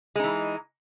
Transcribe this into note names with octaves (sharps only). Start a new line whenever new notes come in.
E3 G#3 D#4